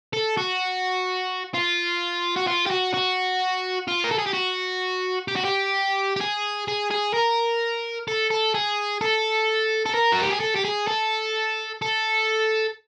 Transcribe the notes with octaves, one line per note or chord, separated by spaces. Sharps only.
A4
F#4
F4
F#4
F4
G4
F#4
F#4
F4
A#4
A4
G#4
G4
F#4
G4
F#4
G4
G4
G#4
G#4
G#4
A#4
A4
A4
G#4
A4
A4
A#4
F#4
G4
G#4
A4
G4
G#4
A4
A4